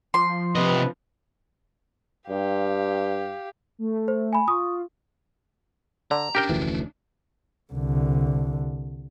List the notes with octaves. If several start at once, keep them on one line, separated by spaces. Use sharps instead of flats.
F3 C6
C3 B4 D#5
G2 G4 F5
A3
C5
G#5 B5
F4 C#6 D#6
D3 A#5
C#4 D4 G4 A#4 G5
F1 D2 E3
C2 D3